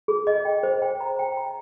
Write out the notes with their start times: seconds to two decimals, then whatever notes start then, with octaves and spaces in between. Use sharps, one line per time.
0.08 G#4
0.27 D#5
0.45 G5
0.63 C5
0.82 G5
1.00 A#5
1.19 G5
1.37 A#5